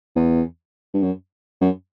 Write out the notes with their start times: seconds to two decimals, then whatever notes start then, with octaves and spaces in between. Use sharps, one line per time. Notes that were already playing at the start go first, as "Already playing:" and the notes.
0.15 E2
0.93 G2
1.02 F#2
1.61 F#2